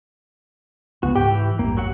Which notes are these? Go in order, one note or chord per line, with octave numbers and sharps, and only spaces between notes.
C#2 C#3 G#3 B3 F#4
G#2 G4 G5
E3
A1 E2 G2 A#3
F#3 F#4 F#5